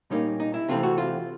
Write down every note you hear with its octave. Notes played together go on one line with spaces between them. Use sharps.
A#2 G3 A#3 C#4 D#4
D#4
E4
C3 E3 A3 C4 F4
F#4
F4